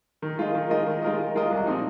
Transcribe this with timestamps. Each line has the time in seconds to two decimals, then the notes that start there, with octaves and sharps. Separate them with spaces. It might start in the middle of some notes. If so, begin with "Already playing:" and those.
0.22 D#3
0.38 G#3 F4 A#4 D#5
0.55 D#3
0.70 G#3 F4 A#4 D#5
0.86 D#3
1.03 G#3 F4 A#4 D#5
1.19 D#3
1.35 G#3 F4 A#4 D#5
1.51 C2
1.67 A#2 F3 C4 D#4